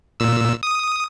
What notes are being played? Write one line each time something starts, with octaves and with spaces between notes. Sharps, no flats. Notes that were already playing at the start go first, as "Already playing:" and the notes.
A#2 E6
D#6